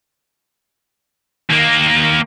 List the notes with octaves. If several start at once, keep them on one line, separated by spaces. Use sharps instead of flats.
D#2 A#3